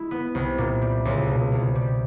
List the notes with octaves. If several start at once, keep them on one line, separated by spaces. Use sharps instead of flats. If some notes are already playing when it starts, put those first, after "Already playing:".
Already playing: G#3 E4
B3
C2
A#2
G3
C#2
B2
C2
G3